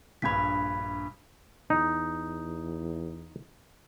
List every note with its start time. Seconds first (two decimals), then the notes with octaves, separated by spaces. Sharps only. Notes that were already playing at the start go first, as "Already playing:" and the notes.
0.22 A#1 G2 B5 G#6 B6
1.70 E2 D#4